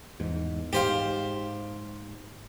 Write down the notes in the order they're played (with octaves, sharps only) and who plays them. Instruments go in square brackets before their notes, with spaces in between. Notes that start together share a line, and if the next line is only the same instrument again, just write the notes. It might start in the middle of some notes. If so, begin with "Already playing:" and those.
[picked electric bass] E2 G#2
[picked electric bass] G#2 [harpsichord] G4 C5 F5